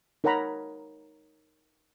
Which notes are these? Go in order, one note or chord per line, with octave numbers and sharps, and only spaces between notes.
D#4 A#4 C#5 F#5 A#5 B5